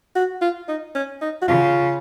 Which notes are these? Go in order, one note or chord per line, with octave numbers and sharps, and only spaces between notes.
F#4
F4
D#4
C#4
D#4
F#4
C#3 F4